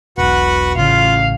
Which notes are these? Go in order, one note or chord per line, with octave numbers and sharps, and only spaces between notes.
E1 B1 F#4 B4 F#5
A1 C#3 F4 F5